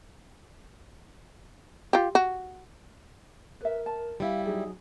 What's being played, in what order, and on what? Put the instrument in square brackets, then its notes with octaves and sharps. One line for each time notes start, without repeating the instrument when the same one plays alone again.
[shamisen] F4 G4
F#4
[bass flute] A#4 [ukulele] B4 E5
[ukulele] A5
[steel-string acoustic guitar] G3 E4 [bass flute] F5
[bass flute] F#3 [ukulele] D#4 G#4